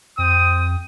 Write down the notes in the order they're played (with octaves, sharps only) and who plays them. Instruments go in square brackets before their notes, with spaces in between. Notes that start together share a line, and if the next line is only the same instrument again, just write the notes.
[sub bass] F2 [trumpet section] C4 G5 D#6